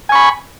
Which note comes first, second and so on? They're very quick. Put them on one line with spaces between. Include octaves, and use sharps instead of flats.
G#5 C#6 B5